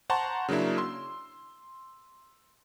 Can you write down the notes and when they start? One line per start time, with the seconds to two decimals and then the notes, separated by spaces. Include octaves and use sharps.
0.10 C5 F#5 A5 A#5 C6 C#6
0.48 C#3 F#3 A#3 D4 E4
0.77 C6 E6